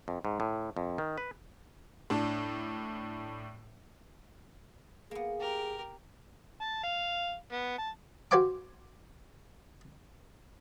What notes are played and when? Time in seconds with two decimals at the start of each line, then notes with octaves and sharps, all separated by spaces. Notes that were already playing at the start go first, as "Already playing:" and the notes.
0.08 F2
0.25 G#2
0.40 A2
0.77 F2
0.98 D#3
1.18 B4
2.10 A2 D4
5.11 A#3 B3 G#4
5.40 G4 A#4
6.61 A5
6.83 F5
7.52 B3
7.78 A5
8.31 F#4 G4 C5 F5 G#5 D6